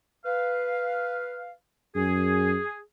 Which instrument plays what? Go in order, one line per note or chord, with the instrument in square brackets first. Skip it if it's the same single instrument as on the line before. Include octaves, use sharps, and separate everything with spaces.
[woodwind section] B4 F5
[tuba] F#2 [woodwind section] G#4